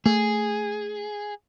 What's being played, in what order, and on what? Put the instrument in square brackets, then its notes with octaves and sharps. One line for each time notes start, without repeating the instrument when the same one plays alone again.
[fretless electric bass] A3 [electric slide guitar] G#4